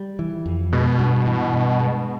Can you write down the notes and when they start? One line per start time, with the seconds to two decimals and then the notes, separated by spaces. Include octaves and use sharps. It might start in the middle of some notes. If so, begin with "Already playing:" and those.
Already playing: G3
0.19 E3
0.46 F2
0.72 B2 G#3
0.99 G2
1.27 E3
1.53 G2
1.80 G#3